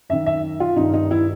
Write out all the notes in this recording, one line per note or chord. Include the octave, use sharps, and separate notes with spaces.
F#2 D#3 E5
E5
F4
G2 D#3 D#4
D#4
E4